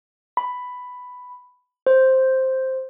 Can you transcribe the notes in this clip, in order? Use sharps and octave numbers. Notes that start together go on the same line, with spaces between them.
B5
C5